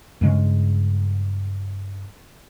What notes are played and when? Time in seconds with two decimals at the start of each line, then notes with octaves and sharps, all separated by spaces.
0.21 G2 C#3 G#3